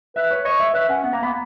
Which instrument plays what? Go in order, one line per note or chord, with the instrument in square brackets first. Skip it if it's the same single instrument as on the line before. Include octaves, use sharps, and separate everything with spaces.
[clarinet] B4 [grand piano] E5
[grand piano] C#5
[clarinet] C#5 [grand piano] D#5
[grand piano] E5
[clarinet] B4 [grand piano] E5
[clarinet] C#4 [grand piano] F#5
[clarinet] B3 [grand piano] F#5
[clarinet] A#3 [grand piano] A#5
[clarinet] B3 [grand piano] B5